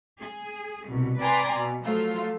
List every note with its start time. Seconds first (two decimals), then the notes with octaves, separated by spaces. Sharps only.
0.19 G#4
0.88 C2 B2
1.18 B4 D5 G5 G#5 A#5 C6
1.53 B2
1.83 F3 F#3 A3 F4